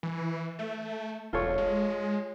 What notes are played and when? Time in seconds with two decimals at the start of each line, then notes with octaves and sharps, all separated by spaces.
0.03 E3
0.59 A3
1.33 E1 F4 A4 C#5
1.58 G#3